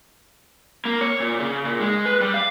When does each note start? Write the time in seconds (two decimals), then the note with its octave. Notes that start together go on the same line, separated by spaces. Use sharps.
0.85 A#3
1.01 C#5
1.20 A#2
1.40 C#3
1.65 A#2
1.80 G#3
2.05 B4
2.21 G3
2.34 F5